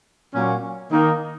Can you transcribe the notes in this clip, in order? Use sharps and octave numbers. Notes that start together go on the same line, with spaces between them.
A#2 F#3 A#3 C#4
D#3 A#3 D#4